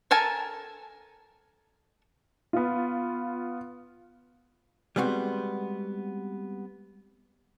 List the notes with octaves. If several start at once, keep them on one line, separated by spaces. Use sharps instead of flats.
A4 A#4 G#5 A5
B3 F4
G3 G#3 B3 C4 F#4